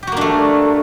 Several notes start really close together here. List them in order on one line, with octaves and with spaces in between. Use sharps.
G4 F#4 A#3 D4 A3